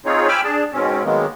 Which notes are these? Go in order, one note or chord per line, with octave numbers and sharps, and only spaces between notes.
C4 D#4 F4 G#4 C#5
G5 G#5 B5 D6 E6 F6
D4 G#4 A5
G#2 B2 C4 C#4
D#3 F#3 G#3 A#3 B3